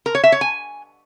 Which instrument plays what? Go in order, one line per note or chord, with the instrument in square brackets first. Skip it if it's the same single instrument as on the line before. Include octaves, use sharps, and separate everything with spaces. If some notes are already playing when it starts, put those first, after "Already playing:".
[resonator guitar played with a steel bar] A#4
C#5
E5
C#5
G#5